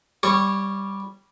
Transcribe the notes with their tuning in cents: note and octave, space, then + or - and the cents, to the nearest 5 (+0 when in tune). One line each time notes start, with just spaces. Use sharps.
G3 +0 C#5 -20 C#6 +0